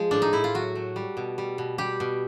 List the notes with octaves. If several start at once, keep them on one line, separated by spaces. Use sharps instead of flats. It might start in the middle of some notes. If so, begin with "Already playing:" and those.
Already playing: F3 G#3
A2 D4
D#4
A2 E4
F4
F#3 F#4
A3
G3
B2
G3
B2
G3 G4
B2